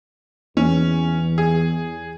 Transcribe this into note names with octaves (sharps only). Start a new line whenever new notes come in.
E2 C#4
G#4